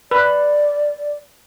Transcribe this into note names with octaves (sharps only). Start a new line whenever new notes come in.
B4 D5